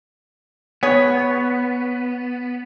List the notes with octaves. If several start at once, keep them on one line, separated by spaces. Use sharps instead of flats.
B3 G#4 C#5